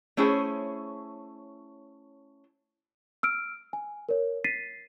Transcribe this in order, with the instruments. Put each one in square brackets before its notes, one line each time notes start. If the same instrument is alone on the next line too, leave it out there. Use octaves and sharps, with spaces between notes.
[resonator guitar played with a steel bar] A3 C#4 E4 G#4 C5 C#5
[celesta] E6 F6 D7
G#5
A#4 C#5
A6 B6 C7 D#7